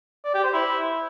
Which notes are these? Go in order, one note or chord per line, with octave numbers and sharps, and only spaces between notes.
D5
G4
C5
E4